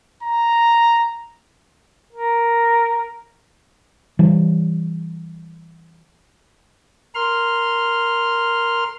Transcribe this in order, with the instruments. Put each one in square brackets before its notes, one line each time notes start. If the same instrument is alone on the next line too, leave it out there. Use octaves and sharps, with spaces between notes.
[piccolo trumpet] A#5
[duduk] A#4
[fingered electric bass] E3 G3
[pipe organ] A#4 C6 F6